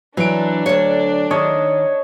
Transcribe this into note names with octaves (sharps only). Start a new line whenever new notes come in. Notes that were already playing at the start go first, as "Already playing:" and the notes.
E3 F#3 D4 D7
D2 C#5
D#3 C#5 D#5 A5